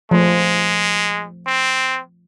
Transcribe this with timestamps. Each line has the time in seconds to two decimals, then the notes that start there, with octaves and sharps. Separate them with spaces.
0.11 F3 G#3 A3
1.46 C4